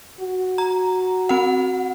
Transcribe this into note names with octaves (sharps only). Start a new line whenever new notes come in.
F#4
A#5
C4 F#5